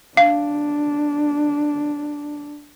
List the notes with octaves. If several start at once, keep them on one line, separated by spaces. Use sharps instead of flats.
D4 F5